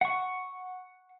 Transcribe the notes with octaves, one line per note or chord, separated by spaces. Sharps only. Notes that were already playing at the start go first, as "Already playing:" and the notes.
F#5 C#6